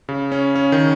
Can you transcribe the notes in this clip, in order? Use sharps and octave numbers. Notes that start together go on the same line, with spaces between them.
C#3
C#4
C#4
D#3